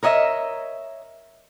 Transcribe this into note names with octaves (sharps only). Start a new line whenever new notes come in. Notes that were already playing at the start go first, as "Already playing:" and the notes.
A#4 C#5 D#5 E5